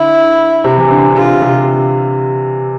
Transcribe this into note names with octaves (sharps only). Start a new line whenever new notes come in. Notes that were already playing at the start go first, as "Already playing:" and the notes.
Already playing: D3 E4
C3
E3
D3
D3
C3 F4
C3